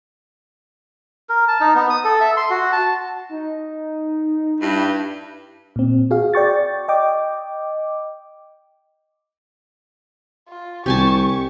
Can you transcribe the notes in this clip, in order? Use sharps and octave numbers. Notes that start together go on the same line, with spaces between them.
A#4
A5
D#4
B3
D#6
A4
E5
C6
F#4
A5
D#4
G2 E4
A#2 C4
F#4 G#4 F5
D5 G5 C#6 A6
D#5 G5 D6
F4
C2 C3 C4 G4 G#5 A5 C#6